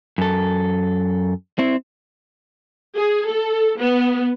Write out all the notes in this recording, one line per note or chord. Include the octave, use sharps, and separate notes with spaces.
F#2 A4
C4 E4
G#4
A4
B3